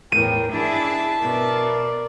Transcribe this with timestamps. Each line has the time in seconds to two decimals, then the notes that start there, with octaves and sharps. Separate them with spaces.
0.12 E2 A2 A#4 G5 D#7
0.52 F2 D4 E4 G#4 E5 A5
1.22 B2 A#4 D5